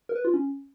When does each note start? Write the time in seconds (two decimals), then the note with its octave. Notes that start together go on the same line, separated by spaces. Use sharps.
0.09 A#4
0.15 B4
0.25 F4
0.34 C#4